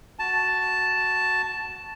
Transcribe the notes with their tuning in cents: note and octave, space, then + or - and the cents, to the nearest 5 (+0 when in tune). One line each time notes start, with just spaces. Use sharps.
F#4 +0 A5 +0